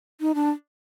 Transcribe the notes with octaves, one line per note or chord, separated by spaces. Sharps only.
D#4
D4